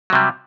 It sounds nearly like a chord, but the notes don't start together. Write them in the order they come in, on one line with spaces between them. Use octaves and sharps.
F#3 C3 G3